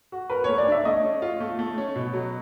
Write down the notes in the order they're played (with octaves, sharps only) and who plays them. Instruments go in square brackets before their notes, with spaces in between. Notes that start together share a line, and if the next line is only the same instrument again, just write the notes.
[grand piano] F#4
[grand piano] A#4 [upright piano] B4
[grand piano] A3 [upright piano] C#5
[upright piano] D5
[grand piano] D4 [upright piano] E5
[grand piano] A3 [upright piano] D#5
[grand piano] C#4
F4
A3
A3
C#4
B2
F#3